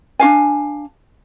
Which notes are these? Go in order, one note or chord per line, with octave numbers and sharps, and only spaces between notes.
D4 F#4 F5 G#5